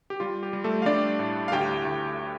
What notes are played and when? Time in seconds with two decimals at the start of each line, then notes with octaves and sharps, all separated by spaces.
0.10 G4
0.20 G3 F4
0.43 G4
0.53 G3
0.64 A3 A4
0.82 F5
0.86 G3 D4 D5
1.19 A2
1.48 F5
1.52 D2 G4 G5
1.85 D2